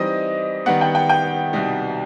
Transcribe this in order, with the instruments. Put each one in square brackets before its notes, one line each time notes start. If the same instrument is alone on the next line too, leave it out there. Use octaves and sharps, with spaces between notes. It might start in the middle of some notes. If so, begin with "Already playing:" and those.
Already playing: [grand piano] E3 G3 C4 D#4 [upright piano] D#5
[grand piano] D#3 G3 B3 [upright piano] F#5
[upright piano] G5
G5
G5
[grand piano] C2 B2 G3 D#4